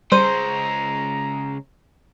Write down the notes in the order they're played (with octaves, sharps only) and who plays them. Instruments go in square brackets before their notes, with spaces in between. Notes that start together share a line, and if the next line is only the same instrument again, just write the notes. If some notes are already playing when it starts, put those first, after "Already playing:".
[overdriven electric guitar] C#3 G#3 [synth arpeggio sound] G3 D#7 [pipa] C5 [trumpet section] A#5